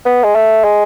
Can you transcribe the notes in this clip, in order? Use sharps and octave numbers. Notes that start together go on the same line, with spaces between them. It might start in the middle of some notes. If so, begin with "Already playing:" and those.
B3
G#3
A3
G#3